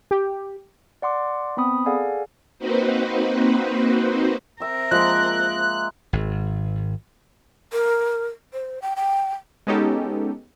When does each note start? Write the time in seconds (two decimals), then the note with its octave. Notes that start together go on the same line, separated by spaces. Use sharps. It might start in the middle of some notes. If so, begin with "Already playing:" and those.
0.11 G4
1.02 D5 F#5 C6 D6
1.57 B3 C4 B5 D#6
1.86 G#4 A4 D5 F5 F#5 G#5
2.59 A#3 C4 D#4 F#4 B4 C5
4.60 C4 A#4 E5 G5
4.91 F3 G#3 A#3 F#6
6.13 G#1
7.73 A#4
8.53 C5
8.82 G5
8.96 G5
9.67 G#3 B3 C#4 D#4 G4 A4